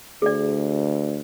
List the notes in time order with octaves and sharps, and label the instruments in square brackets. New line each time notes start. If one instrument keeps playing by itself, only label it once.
[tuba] D2 [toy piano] G#4 D5